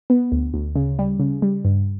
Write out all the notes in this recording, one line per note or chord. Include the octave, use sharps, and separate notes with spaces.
B3
D2
D2
C#3
G3
C#3
G3
G2